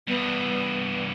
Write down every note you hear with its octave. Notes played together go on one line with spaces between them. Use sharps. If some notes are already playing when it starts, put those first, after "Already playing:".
G2 E3 B3